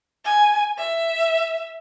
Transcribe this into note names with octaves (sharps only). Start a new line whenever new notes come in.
G#5
E5